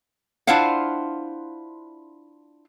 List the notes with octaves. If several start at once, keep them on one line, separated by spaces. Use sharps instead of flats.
D4 E4 F4 C5 F5 F#5